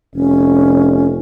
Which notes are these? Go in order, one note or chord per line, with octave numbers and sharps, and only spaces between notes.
F1 C#4